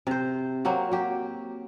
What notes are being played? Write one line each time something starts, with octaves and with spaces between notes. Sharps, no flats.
C3 C5
F#3 A#3 C4 F#4
F#3 G4